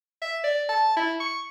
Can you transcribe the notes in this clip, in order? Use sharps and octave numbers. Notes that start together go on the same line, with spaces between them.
E5
D5
A5
E4
C#6